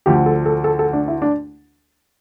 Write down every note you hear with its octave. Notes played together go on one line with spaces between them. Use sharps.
D2 D3 F3 G4
A4
A4
A4
A4
D4
E4
D4